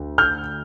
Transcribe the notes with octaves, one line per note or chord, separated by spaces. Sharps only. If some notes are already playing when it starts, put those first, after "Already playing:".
Already playing: D2
F6 G6